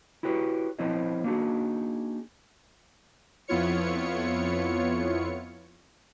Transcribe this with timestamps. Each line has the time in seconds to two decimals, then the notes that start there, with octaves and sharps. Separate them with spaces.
0.23 E4 F#4 G4 B4 C#5
0.79 F3 C4 E4 C5 C#5 D#5
1.24 A#3 D4 D#4 F#4 G#4
3.48 F2 B3 E4 F4 C#5 C#7